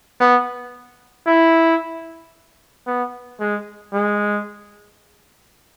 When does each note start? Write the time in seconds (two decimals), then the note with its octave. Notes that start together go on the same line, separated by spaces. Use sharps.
0.20 B3
1.27 E4
2.87 B3
3.40 G#3
3.93 G#3